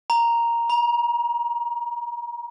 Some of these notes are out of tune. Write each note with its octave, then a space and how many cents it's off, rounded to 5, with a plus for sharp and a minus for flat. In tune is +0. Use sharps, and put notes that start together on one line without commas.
A#5 +0
A#5 +35